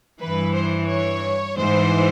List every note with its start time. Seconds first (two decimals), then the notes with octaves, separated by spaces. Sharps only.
0.20 G2 E3 B4
0.54 C5
0.89 C#5
1.56 G#2 E3 C5